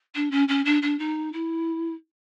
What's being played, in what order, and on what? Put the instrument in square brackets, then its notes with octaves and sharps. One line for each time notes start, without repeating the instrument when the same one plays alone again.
[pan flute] D4
C#4
C#4
D4
D4
D#4
E4